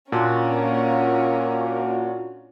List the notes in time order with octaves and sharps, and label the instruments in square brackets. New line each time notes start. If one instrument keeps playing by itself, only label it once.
[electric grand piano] A#2 [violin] C#4 A#4 [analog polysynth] D4 F4 F#4
[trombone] A#3